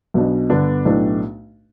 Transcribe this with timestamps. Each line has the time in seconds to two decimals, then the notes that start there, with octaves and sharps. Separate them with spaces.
0.14 B1 B2 B3 D4
0.50 G1 G2 D3 B3 D4
0.85 B1 A2 A3 D4 B4